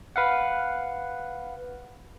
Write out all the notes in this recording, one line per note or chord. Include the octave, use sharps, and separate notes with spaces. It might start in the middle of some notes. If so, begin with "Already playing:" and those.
B4 F5 F#5